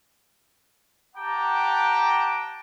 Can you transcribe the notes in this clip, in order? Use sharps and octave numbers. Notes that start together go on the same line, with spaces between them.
G4 F#5 G5 A5 A#5 D6